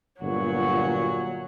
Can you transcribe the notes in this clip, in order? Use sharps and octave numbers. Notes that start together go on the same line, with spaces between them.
G1 A#2 F#3 F#4